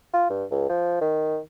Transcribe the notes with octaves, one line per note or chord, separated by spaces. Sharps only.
F4
G2
C#2
F3
D#3